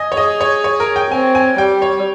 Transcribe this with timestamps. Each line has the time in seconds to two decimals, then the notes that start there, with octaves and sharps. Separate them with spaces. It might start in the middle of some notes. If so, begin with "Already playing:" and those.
Already playing: D#5 G#5
0.12 C#5
0.16 G#4 D#5
0.41 C#5
0.64 C#5
0.80 A#4
0.96 G5
1.11 C4 G#5
1.35 G#5
1.58 G3 G5
1.82 C#5